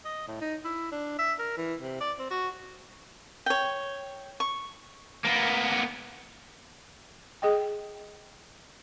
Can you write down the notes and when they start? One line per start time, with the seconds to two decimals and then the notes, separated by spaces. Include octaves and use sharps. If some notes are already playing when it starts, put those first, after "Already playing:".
0.05 D#5
0.28 A2
0.41 D#4
0.64 E4
0.92 D4
1.18 E5
1.39 A#4
1.57 E3
1.79 C3
2.00 D5
2.19 C4
2.30 F#4
3.46 C#5 G5
4.40 C#6
5.25 A#3 B3
7.42 G#4 D#5 G5